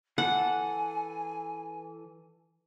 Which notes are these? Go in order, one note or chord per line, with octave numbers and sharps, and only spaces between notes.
E3 A4 F#5 G#5